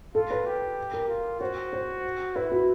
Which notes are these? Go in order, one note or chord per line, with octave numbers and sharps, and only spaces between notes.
F4 A4
B4
G4
A#4
F4
F#4 C5
C5
E4 B4
F#4